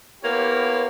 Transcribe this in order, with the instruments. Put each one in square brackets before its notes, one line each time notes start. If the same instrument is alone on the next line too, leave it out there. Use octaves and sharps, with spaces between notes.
[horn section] A#3 B3 E4 G4 C#5